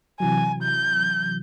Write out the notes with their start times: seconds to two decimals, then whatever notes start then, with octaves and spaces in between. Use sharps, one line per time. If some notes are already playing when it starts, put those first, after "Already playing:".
0.20 C3 E3 F#3 G#5
0.63 G6